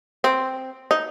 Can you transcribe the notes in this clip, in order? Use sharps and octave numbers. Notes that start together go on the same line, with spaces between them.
C4
D#4